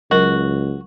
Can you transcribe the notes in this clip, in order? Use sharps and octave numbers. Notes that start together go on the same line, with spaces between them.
C#2 F#3 F#4 A#4